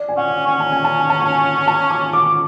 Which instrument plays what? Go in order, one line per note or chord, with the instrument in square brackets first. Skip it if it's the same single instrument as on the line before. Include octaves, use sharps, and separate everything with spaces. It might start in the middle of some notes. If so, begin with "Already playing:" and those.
Already playing: [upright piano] D5
G#5
[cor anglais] C#4 [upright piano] F#5
[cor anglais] C#4 [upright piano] G#5
[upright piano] A5
G#5
A5
G#5
A5
G#5
A5
C#6
D6